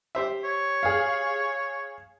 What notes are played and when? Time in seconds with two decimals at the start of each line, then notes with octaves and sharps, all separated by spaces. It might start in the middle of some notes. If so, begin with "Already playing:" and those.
0.15 G4 C5 E5
0.44 C#5
0.83 G#4 F5